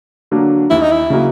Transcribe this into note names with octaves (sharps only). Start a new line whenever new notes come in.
D3 F#3 A#3 D4
D#2 E4
D#4
E4
C#3 F#3 A#3